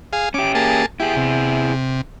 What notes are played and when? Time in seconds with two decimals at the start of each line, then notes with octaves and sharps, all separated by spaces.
0.13 G#4 F5
0.34 C#4 G4 D6
0.55 A#3 G#4 A5
1.00 E4 G4 G#4
1.16 C3